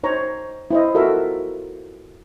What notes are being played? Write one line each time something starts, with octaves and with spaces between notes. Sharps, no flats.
D#4 C5 C#5 A#5
E4 C5 D#5
F4 F#4 A4 A#4 E5